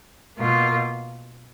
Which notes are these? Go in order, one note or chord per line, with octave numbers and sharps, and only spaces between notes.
B2 A#3 F4